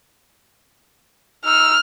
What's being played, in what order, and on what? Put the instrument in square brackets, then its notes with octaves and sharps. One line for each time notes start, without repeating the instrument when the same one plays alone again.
[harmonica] D#4 E6 [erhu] F6